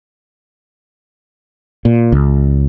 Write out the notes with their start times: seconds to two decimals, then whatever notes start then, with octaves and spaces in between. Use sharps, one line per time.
1.85 A#2
2.12 C#2